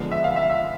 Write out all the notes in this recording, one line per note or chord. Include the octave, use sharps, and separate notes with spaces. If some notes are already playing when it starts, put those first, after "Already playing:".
Already playing: D3 F3 G#3 B3
E5
F5
E5
E5